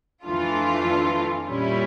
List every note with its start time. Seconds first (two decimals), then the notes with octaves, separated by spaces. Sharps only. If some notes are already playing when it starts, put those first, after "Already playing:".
0.25 F2 E3 A3 D4 F4
1.47 A#2 G3 C#4 E4